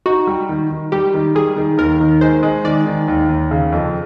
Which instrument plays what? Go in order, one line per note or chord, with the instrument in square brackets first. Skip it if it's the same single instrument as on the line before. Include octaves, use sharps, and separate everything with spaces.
[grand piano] D#4 [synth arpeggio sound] F#4
[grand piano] G3
D#3
D#3
[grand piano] G3 [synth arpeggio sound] G4
[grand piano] D#3
[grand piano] G3 [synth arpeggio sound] G#4
[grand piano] D#3
[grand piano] D#2 [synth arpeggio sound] A#4
[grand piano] D#3
[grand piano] G#3 [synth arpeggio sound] C5
[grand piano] G#3
[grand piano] D#3 [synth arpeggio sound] D5
[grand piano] D#3
D#2
D#2
C#3
F2